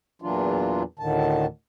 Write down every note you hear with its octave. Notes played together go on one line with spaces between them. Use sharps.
E2 A#2 E3 F#3 D4 F4
D2 A2 D3 D#3 A5